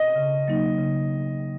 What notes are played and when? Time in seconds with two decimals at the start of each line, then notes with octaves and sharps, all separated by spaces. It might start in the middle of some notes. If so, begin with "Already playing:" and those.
Already playing: D#5
0.16 C#3
0.48 F#3 A#3 D#4
0.79 C#3